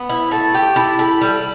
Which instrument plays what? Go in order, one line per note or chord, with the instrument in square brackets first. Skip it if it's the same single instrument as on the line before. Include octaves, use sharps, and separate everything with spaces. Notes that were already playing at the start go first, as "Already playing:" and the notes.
Already playing: [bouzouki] B3
[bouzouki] E4 [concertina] B5
[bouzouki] A3 [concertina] A5
[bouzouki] G4 [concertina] G5
[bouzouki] E4 [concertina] A5
[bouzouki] A4 [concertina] B5
[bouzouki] G3